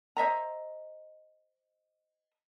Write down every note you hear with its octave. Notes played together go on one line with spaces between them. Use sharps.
C5 D#5 E5 A#5